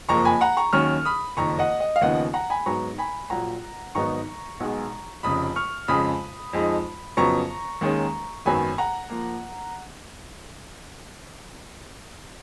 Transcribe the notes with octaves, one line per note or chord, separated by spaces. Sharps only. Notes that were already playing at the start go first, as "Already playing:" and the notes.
F#1 F2 F3 A#3 A#5 C#6
G#5 B5
F#5 A#5
A#5 C#6
D#2 D#3 F#3 C#4 C#6 F6
B5 D#6
F#1 F2 D#3 A#5 C#6
D#5 F#5
D#5
F5
D#2 C#3 F3 B3 D#4 D#5 F#5
F#5 A#5
G#5 B5
G#2 F#3 B3 A#5 C#6
G#5 B5
A#1 A#2 F#3 F#5 A#5
G#1 G#2 F#3 B3 D#4 A#5 C#6
B1 B2 G#3
F1 F2 C#3 B5 D#6
C#6 F6
F2 C#3 G#3 B5 D#6
F2 F3 G#3 D#4
F2 C#3 F#3 B3 A#5 C#6
D#2 D#3 G#3 C#4
G#1 F#2 D#3 F#3 B3 G#5 B5
F#5 A#5
F3 A#3